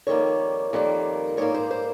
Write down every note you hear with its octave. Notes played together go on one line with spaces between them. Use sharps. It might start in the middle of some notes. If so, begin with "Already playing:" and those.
F2 D#3 G3 A#3 C#5
F2 D#3 G3 A#3
G#2 G3 A#3 C#5
C5
C5